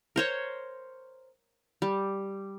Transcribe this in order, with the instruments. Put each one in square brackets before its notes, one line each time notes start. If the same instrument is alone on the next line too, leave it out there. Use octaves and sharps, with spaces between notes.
[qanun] A#4 C5 C#5
G3